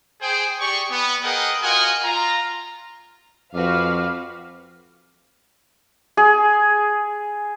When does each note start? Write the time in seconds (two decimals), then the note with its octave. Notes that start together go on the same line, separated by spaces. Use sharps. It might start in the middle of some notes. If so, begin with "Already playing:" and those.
0.21 G#4 C5 G5
0.60 G4 G#4 D5 C#6
0.90 B3
1.23 G#4 A#4 B4 D#5 F#5 G5
1.62 F4 F#4 A#4 D#5 F#5 G#5
2.03 F4 A#5
3.54 F2 F#4 B4 F5 D6 F6
6.17 G#4